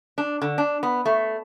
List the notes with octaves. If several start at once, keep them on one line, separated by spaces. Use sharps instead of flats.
D4
D3
D4
B3
A3